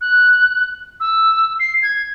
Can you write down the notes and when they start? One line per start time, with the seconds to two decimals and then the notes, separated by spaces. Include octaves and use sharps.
0.01 F#6
1.00 E6
1.60 C7
1.83 G#6